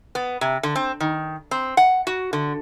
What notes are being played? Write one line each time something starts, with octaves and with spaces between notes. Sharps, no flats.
B3
C3
D3
C4
D#3
C4
F#5
F#4
D3